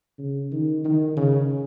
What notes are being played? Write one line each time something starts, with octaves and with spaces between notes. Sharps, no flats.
C#3
D#3
D#3
C#3